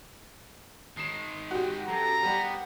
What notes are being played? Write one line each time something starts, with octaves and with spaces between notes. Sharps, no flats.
D#3 G#3 C7 E7
F#4 G4
F#2 A4 A#5
G3 B3 G4 F#5